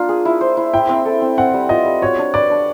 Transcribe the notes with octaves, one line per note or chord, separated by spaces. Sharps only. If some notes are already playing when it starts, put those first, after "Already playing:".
Already playing: A#3 D4 F4
G#4
E4
C5
E4
E4 G5
C4
A4
C4
C4 F#5
G3
F4 D#5
G3
F#4 C#5
D4
B4 D5
D4